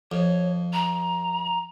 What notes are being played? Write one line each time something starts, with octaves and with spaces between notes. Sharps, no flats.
F2 C#5
A#5